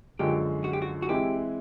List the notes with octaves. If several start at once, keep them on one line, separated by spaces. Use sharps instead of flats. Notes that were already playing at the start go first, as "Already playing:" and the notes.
F#2 D3 F3 G#3 G4
F#4
G4
F#4
F#4
E3 G#3 C4 E4 G4